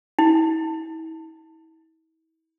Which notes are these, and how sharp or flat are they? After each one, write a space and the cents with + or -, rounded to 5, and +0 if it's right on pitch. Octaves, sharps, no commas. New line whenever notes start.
E4 -40